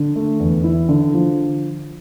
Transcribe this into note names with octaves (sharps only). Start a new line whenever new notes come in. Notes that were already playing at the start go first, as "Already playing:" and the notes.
Already playing: D3
A3
E2
E4
D3
F3